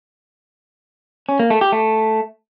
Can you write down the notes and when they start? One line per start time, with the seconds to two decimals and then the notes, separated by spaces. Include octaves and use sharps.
1.29 C#4
1.40 A#3
1.50 A3
1.61 G4
1.72 A3